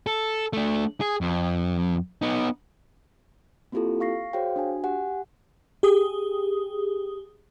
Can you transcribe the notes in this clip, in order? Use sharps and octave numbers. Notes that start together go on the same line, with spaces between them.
A4
A3 D4
G#4
F2
B3 D#4
A#3 C4 E4 F4 G4 A4
F5 C#6 A#6 C7
F#4 G#4 C5 C#5 F5 G5
D4 F#4 G#5
G4 F#5 G#5
G4 G#4 D#6